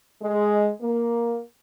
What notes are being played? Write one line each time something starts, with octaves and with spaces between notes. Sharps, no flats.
G#3
A#3